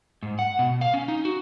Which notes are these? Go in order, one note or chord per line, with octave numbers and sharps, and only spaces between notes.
G#2
F#5
B2
F5
C#4
D#4
F#4